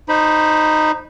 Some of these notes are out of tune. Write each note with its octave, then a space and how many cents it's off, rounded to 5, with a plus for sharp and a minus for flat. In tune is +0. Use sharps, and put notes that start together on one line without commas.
D#4 -10 C5 +0 B5 -15